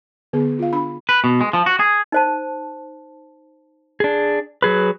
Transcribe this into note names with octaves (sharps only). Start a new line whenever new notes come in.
D3 B3 G#4
F4 F5
D4 B5
B4
B2
G#3
F3
F#4
G#4
D#4 C5 A5
D4 G#4
F#3 G#4 B4